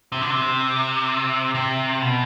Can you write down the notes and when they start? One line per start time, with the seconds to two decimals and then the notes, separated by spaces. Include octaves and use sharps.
0.12 C3
0.21 D3
0.30 C3
1.55 C3
2.02 B2